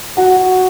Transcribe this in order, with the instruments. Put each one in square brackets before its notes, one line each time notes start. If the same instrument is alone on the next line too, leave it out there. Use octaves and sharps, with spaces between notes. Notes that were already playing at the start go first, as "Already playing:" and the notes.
[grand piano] F#4 F#5